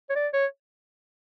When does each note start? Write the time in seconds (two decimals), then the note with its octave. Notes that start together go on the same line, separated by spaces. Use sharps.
0.09 C#5
0.15 D5
0.33 C#5